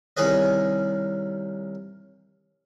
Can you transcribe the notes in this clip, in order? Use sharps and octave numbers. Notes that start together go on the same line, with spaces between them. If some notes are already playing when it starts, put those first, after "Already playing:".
C2 D#3 C#4 G#4 B4 D#5